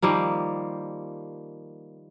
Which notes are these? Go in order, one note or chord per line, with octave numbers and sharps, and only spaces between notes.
D#3 F3 G3 A#3